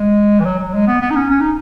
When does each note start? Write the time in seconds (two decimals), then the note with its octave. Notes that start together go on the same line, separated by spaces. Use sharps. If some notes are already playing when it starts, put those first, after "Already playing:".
Already playing: G#3
0.40 E3
0.45 F#3
0.59 F#3
0.74 G#3
0.88 B3
1.02 B3
1.11 D#4
1.16 C#4
1.30 C#4
1.40 D#4